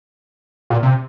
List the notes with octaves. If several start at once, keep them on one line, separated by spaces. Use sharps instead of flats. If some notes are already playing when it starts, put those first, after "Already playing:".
A#2
C3